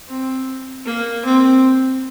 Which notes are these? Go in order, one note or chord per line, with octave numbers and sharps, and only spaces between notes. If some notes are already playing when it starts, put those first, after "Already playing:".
C4
A#3
C4